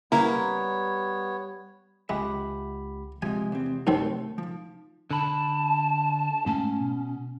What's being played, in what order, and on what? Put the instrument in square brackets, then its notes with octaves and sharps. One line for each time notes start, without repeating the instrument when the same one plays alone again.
[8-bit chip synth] C#3 A#3 E4 [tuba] G3 [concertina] B3 C#5 [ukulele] A#5
[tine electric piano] C#2 G4 B5 [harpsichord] G#3 [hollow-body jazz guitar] E5 F#5
[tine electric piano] C3 [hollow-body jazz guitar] F3 G#3 [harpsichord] G#5
[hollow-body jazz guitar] E2 C4
[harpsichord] F#2 G3 C4 [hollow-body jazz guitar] A3 [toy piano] D#4 C5
[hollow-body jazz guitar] F3
[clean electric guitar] D3 B5 [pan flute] A5
[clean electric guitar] G#2 A3 A5 [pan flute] C#4
[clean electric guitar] B2